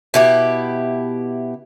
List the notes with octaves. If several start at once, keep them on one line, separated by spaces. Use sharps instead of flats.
B2 E4 G4